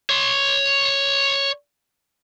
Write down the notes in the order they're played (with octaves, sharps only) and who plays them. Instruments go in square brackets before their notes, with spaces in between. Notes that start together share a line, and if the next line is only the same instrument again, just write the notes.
[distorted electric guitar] C#5 C6